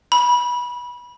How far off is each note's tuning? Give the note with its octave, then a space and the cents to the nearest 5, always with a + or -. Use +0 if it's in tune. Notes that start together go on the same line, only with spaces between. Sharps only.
B5 -20